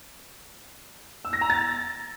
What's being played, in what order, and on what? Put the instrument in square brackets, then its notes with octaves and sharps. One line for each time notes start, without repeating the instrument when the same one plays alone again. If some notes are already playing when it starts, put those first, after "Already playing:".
[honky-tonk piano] E6
A#6
A#5
A6